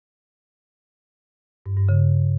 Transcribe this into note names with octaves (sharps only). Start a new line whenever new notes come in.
G2
G2
C#3